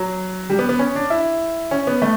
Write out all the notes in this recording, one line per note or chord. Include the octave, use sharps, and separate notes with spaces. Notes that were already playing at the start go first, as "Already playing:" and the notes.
Already playing: F#3
G3
B3
B3
C#4
D4
E4
C#4
B3
A3